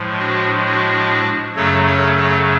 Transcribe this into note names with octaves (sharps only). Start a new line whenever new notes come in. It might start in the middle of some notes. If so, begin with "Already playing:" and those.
Already playing: A2 F3 G#3
D4 F#4
D4 F#4
F#2 C#3 F#3 A3 A4 C#5
A4 C#5
A4 C#5